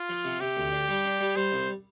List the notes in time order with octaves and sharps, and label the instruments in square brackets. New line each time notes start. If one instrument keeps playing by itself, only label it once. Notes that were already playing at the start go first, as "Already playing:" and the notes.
Already playing: [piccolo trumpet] F4
[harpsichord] F3
C3
[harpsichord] C3 [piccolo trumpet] G4
[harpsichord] D2
D4
G3
D4
G3
[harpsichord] G3 [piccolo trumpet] C5
[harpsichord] C2